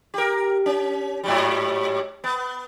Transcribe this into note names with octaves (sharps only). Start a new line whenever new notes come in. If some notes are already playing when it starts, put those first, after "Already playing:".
G4 A#4
C#4
G#2 F#3 G3
B3